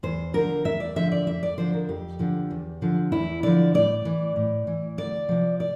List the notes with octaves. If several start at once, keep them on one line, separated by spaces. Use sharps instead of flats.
E2 C5
D3 F3 A#4
E2 E5
D5
D3 F3 E5
D5
F2 E5
D5
D3 F3 C5
A#4
F2 G4
D3 F3
E2
D3 F3
E2 E4
D3 F3 D5
A2 D5
E3
A2
E3
D2 D5
C3 F3
D5